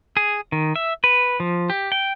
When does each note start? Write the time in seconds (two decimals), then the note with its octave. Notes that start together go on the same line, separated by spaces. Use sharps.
0.17 G#4
0.52 D#3
0.76 E5
1.04 B4
1.40 F3
1.70 G4
1.92 G5